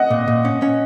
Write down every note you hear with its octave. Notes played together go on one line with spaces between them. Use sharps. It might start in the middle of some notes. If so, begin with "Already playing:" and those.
Already playing: D#5 F#5
A#2
A#2
C#4
C#4